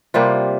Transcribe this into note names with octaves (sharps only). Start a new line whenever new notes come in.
C3 G3 A#3 F4